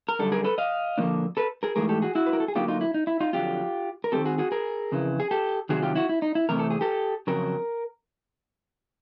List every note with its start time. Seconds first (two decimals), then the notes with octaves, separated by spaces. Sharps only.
0.09 A#4
0.19 F#2 D3 G3 A4
0.32 G#4 A#4
0.44 A4 B4
0.58 D#5 F5
0.98 D3 F3 A#3 D4
1.37 A4 B4
1.63 G#4 A#4
1.76 G#2 E3 A3 G#4 A#4
1.89 G4 A4
2.02 F#4 G#4
2.15 E4 F#4
2.26 B4
2.33 A#4
2.40 A4
2.48 G#4
2.55 D3 F#3 A#3 D#4 F4 G4
2.68 D#4 F4
2.81 E4
2.94 D#4
3.07 E4
3.20 D#4 F4
3.33 F2 D3 F#3 F4 G4
4.04 A#4
4.12 D#3 G#3 C4 G4 A4
4.25 F#4 G#4
4.39 F#4 G#4
4.52 G#4 A#4
4.92 F2 C#3 E3
5.20 G#4
5.31 G4 A4
5.69 C3 D#3 F#3 F#4 G#4
5.82 F4 G4
5.96 E4 F#4
6.09 E4
6.22 D#4
6.35 E4
6.49 C3 E3 A3 C4 A#4
6.59 A4
6.70 G#4
6.81 G4 A4
7.27 F2 C#3 F#3 A#4